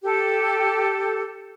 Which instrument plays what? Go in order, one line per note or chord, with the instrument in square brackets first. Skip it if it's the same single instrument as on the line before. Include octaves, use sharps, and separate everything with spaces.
[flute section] G4 A4